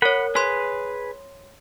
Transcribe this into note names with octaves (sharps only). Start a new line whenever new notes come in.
A#4 C#5 F#5 B5
G#4 B4 C#5 C6